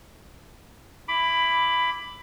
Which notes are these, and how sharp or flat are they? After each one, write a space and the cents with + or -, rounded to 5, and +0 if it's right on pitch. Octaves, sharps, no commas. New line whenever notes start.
E4 +0 B5 +10 D6 +0